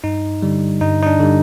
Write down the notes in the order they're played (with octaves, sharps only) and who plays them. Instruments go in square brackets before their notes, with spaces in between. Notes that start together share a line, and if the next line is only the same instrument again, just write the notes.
[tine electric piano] G2 D#4
D3 G3
G2 D#4
D#4
D4
D3 G3